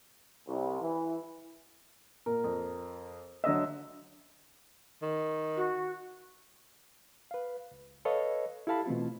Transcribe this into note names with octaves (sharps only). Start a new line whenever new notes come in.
C2
E3
A#2 A#4
F2
D3 F#3 D#5 E5 E6
D#3
F#4
B4 F5
C#2
A4 B4 C#5 D#5 F5
E4 G4 A4 F5 A5 B5
B2 E3 A3 C4 F4